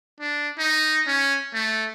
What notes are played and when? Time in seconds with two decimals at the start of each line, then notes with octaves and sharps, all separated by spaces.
0.20 D4
0.58 D#4
1.07 C#4
1.54 A3